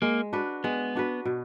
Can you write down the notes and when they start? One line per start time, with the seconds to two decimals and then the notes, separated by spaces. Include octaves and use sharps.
0.02 G#3 A#3
0.33 D4 F#4 B4
0.64 G#3 B3
0.95 D4 F#4 B4
1.25 B2